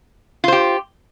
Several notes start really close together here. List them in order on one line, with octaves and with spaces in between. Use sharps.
F4 C5 G4